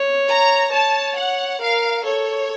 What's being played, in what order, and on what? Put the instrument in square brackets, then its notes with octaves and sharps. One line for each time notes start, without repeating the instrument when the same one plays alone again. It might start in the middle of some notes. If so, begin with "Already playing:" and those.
Already playing: [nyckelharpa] C#5
[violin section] A#5
[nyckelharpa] C#5 [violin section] A5
[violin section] F#5
[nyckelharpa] A#4 [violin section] F5
[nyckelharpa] A4 [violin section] C#5